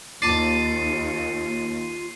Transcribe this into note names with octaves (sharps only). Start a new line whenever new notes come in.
D#2 F4 D5 A5 D6 C7 D#7